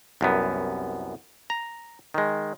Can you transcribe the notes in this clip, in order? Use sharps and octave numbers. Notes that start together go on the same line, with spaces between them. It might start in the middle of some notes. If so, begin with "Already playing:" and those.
C2 F#2 B3
A#5
D#3 G#3